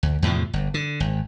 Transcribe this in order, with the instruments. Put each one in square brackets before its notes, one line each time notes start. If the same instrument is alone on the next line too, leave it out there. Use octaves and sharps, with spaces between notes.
[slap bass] D2
E2 A2 C3 F3
G1
D3
G#1